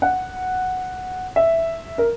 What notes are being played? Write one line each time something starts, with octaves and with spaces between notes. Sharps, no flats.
F#5
E5
A#4